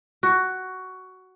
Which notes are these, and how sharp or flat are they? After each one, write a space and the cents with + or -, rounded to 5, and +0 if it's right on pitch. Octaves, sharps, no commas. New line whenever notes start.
F#4 +10